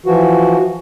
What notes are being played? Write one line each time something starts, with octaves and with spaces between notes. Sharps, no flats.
E3 F3 F#4